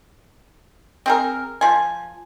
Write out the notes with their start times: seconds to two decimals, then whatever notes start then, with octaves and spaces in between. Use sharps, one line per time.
1.06 C4 G#4 A#4
1.61 F3 G#5